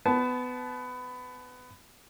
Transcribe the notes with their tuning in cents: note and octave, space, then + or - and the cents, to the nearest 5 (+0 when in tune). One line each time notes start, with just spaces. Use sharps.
B3 +20 A5 -25